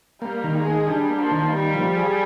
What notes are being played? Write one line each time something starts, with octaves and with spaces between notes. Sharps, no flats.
G3 A#3
D#3
G#3
G#4
G3 D4
A#3
F3
D#3
G3 A#3
F3
G#4